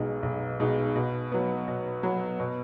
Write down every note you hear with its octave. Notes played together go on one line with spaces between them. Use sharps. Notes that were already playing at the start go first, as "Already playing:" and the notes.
Already playing: B1 B2 G#3 D#4
B1
B2 G#3 D#4
B2
F#3 B3
B2
F#3 B3
B2